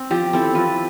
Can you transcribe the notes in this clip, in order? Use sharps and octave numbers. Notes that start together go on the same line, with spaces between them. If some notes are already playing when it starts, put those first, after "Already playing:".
Already playing: C4
F3 G4
C4 E4 A4
F3 B4